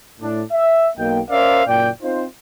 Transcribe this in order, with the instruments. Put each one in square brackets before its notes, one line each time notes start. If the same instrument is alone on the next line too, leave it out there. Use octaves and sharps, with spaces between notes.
[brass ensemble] A2 D4
E5
B1 A#3 D#5 G5
C#4 A#4 C5 D5 E5 F5
F#1 A#2 D5 G5
C4 D#4 F4 C5